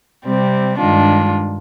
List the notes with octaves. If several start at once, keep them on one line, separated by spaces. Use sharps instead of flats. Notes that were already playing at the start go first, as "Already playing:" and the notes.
C3 G3 C4
G2 D#3 G#3 D4 F4